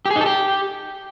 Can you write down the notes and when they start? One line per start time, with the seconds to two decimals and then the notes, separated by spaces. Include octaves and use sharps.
0.05 G4
0.11 G#4
0.16 D#4
0.21 A4
0.26 G4